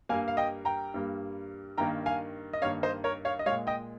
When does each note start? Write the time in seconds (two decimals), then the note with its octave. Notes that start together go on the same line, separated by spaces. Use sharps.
0.09 G2 G3 A#3 F5 G#5
0.28 F5
0.37 D#5 G5
0.65 G5 A#5
0.94 G2 G3 A#3
1.78 G2 D#3 A#3 G5 A#5
2.06 F5 G#5
2.53 D#5
2.62 G2 D#3 A#3 C#5 F5
2.83 C5 D#5
3.04 A#4 C#5
3.25 C#5 F5
3.39 D#5
3.46 G#3 C#5 F5
3.50 A#2
3.67 D#5 G5